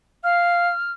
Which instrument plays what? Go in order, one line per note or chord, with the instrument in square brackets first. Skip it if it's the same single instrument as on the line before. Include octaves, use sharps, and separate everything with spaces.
[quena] F5 [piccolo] F6